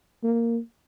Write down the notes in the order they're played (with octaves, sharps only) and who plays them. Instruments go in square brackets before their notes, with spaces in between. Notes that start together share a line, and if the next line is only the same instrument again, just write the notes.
[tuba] A#3